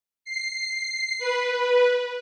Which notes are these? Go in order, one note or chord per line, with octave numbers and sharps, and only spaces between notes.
C7
B4